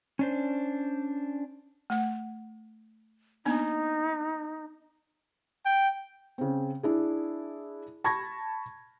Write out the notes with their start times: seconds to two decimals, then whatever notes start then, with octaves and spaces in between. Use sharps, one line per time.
0.19 C#4 D4 C5
1.90 A3 F#5
3.45 A#3 B3 D4 D#4
5.65 G5
6.38 C#3 C4
6.83 D4 E4 G#4
8.04 A5 B5 C#6 G#6 A#6